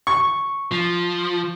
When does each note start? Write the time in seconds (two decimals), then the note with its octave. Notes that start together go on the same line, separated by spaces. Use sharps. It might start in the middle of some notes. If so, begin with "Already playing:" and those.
0.07 C#6
0.72 F3